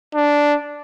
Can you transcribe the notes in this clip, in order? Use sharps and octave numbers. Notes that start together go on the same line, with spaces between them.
D4